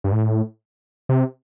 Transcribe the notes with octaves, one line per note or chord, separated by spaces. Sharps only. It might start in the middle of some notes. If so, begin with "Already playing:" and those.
G2
A2
C3